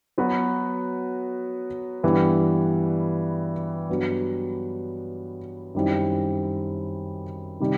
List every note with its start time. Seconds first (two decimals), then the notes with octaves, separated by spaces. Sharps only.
0.18 F#3 B3 F#4 B4
2.03 G2 E3 G3 B3
3.89 G2 F#3 B3
5.75 F#2 D#3 G3 C4 E4
7.60 C3 D#3 G3